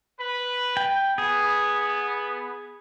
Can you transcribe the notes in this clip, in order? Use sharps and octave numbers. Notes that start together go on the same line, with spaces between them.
B4
G5
B3 G#4